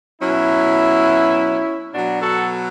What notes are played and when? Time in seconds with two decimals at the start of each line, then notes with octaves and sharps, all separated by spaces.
0.22 B2 F#3 C#4 E4
1.93 B2 F#3 D4 F#4
2.22 F#4 A4